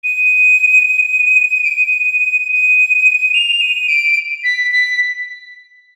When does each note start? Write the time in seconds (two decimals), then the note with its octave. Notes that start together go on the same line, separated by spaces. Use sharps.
0.04 D#7
1.65 D7
1.69 D#7
2.52 D#7
3.34 F7
3.61 D#7
3.89 D7
4.44 B6
4.71 B6